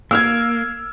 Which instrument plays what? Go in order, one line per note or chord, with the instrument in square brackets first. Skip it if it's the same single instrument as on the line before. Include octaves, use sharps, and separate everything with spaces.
[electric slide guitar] A#3 [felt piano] E6 F6 G#6